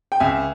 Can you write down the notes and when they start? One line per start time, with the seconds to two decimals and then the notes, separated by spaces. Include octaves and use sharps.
0.12 G5
0.20 C#2 E5 G#5